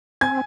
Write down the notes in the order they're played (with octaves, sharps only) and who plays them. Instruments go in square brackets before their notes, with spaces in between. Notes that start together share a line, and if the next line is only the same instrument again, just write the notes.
[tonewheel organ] C4 [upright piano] G#5 G#6